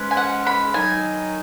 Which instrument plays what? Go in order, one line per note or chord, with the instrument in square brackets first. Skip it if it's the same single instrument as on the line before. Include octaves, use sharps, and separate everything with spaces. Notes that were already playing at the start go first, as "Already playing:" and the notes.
Already playing: [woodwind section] G#2 G#3 C#4 B4
[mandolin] G#5
F#5
B5
[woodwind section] D#3 F#3 D#4 [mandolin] G#5